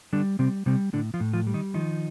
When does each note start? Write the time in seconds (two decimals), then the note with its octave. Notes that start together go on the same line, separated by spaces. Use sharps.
0.13 D3 G3 D4
0.39 C3 G3 C4
0.66 C3 G3 C4
0.93 A2 D3 D4
1.14 F3 F4
1.20 A2
1.33 F3 F4
1.47 G3
1.54 D#3 D#4
1.74 D#3 F3 D#4